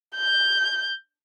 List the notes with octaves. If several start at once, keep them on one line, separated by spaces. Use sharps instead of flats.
G6